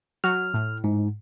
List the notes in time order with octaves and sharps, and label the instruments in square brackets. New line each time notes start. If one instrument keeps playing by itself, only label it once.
[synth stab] F#3 [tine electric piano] F6
[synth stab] A2
[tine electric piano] G#2